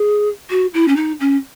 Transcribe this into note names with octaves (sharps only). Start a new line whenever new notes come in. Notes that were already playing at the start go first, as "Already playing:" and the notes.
Already playing: G#4
F#4
E4
C#4
D#4
C#4